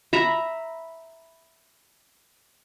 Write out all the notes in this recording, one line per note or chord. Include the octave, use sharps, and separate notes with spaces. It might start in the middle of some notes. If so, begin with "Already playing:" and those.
E5 A#5 B5